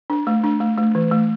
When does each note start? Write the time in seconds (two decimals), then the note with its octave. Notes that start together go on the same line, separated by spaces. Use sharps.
0.10 D4
0.27 A3
0.44 D4
0.60 A3
0.78 A3
0.95 E3
1.11 A3